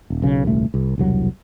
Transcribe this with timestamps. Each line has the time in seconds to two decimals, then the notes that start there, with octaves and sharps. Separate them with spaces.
0.10 D#1
0.22 B1 C#3
0.45 D#1 C2 A3
0.74 C2
0.98 E1 C2 F#3